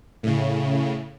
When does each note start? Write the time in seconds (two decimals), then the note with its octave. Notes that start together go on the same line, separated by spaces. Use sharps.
0.23 A2 C#3